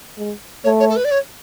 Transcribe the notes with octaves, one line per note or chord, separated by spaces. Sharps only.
G#3
A3 C#5
C#5
A4
B4
D5
C#5